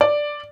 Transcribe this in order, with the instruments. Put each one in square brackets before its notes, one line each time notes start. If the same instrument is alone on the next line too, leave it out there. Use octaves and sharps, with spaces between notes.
[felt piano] D5